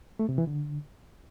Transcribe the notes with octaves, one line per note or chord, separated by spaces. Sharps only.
A3
C3
E3
D3